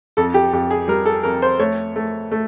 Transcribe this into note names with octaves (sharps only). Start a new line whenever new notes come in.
F2 A4
G4
F2 G4
G#4
G3 A#4
A4
F2 A#4
C5
A3 C#5
A3
A3